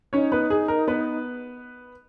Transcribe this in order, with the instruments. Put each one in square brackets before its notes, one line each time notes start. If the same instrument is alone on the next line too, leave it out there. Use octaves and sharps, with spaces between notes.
[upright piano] C#4 C#5 [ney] D#4
[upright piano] B3 B4
G#4
A#4
B3 B4